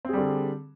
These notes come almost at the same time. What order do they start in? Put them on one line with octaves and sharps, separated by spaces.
C4 G#4 G3 D3